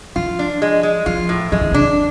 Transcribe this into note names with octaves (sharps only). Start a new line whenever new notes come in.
F3 F4
D4
G#3
G#3
F3 F4
A2
F3 G#3
D3
C#3 D4
D3